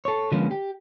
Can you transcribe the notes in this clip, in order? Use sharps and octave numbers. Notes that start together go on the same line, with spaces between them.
A4 C#5
D3 F3 G#3 A#3 B3 C#4
G4